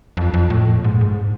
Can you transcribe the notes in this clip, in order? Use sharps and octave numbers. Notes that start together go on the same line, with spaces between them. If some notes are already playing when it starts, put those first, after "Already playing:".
F2
F2
A2
A#2
G#2
G#2